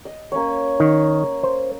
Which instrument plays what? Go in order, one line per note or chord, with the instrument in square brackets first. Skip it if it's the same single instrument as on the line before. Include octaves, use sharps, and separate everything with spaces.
[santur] D#5
A#3 C#4 C#5
[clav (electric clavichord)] D#3
C5